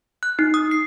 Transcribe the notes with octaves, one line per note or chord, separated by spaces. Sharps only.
F#6
D#4
D#6
C7